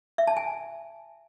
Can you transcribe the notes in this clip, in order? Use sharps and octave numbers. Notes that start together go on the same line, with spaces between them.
E5
A5
G#5